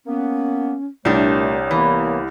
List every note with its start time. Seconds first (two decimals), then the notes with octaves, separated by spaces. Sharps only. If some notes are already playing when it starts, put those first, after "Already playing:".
0.06 A#3 B3 C#4
1.05 C2 A#2 G3 A3 D4 C#5
1.71 E3 A#3 B3